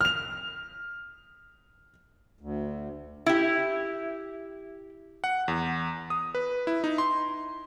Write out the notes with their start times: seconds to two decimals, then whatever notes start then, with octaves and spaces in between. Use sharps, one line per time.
0.01 F6 F7
2.41 D2
3.26 E4 G4
5.24 F#5
5.48 E2
6.10 D#6
6.35 B4
6.67 E4
6.84 D#4
6.98 C6